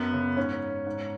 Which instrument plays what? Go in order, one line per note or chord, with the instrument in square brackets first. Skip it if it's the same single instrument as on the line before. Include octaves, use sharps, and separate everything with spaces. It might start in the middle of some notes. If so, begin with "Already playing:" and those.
Already playing: [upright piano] F#2 B3
C#3
G#2 C#4
G#2